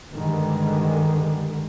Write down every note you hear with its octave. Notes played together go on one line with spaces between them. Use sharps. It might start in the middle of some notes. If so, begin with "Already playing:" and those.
G2 D3 D#3 G3 G#3